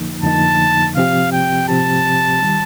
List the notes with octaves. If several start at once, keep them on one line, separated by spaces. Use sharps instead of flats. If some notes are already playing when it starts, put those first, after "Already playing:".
Already playing: F2 D3 F3 A#3 D#4
F2 D3 F3 A#3 D#4 A5
C3 F3 C4 G4 F5
G5
C3 F3 C4 G4 A5
D#3 G3